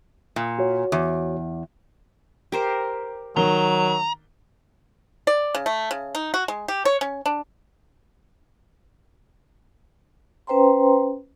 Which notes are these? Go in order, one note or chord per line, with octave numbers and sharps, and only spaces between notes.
A#2
F#4 C#5
E2
G4 A#4 C5
D#3 F#3 A#5 G7
D5
C#3
A3
C#3
D#4
F#4
G#3
G4
C#5
C#4
D4
C#4 B4 C5 G5 A#5 C6